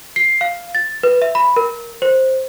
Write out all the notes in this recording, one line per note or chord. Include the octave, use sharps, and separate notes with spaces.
C7
F5
A6
B4
E5
B5
A#4
C5